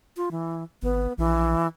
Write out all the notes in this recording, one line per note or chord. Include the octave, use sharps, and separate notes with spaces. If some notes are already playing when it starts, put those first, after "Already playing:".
F4
E3
G#1 B3
A#1 E3